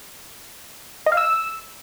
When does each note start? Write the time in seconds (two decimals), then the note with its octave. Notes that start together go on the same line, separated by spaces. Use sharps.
1.06 D#5
1.12 F5
1.17 E6